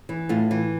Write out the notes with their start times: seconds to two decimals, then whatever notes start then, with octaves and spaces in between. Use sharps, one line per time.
0.09 E3
0.29 A2 F4
0.51 E3